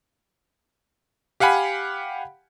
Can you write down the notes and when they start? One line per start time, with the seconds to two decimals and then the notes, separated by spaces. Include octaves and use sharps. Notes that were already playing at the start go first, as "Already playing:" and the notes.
1.40 G4 F5 F#5 G#5 B5